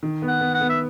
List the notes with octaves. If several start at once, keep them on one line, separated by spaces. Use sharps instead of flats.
D#3
B3
F#5
B3
F#5
B3
E5